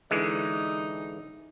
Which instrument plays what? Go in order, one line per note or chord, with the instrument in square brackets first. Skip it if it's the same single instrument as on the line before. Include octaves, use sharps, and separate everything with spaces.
[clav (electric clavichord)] D3 E3 G#3 [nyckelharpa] D#4